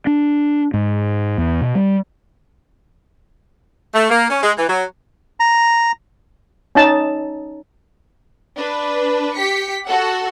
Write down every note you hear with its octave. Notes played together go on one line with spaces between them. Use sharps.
D4
G#2
E2
B2
G3
A3
A#3
C#4
G#3
E3
F#3
A#5
C#4 D#4 A5
D4 B4
G4 B6 C#7
F#4 A4 F#5